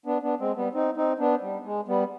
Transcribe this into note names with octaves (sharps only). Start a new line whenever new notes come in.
B3 D4
B3 D4
G#3 C4
G3 B3
C4 D#4
C4 D#4
B3 D4
G3
G#3
G3 B3